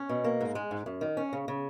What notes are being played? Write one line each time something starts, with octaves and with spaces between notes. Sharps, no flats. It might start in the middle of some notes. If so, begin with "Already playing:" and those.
Already playing: C#4
B2
A#3
G#2
G#3
G#2
F#2
D#3
C#4
C#3
C#3